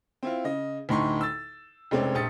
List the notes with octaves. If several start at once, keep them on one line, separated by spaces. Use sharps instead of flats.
C4 E4 F4
C#3 D#5
D2 A2 D#4 C6 C#6
E6 A6
F1 G#3 C4 C#4 D5
A#1 G4 D#6 A6 C#7